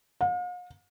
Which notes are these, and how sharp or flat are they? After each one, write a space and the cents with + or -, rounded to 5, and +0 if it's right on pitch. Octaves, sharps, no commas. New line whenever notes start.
F5 +45